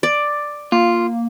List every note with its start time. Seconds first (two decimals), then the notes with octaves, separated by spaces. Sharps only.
0.03 D5
0.72 A#3 F4